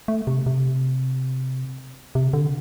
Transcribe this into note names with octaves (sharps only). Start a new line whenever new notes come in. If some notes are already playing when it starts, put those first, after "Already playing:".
A3
C3
C3
C3
D3